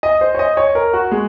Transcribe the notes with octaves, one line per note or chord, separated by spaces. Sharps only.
D#5
C5
C#5
D#5
C#5
A#4
F#4
G#3